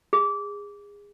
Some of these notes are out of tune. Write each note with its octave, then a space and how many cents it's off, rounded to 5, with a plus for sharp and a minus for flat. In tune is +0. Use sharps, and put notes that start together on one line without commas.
G#4 -25